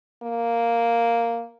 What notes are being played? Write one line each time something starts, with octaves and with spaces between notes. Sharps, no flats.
A#3